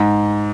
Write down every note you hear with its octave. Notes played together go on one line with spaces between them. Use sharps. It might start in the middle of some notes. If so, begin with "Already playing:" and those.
Already playing: G#2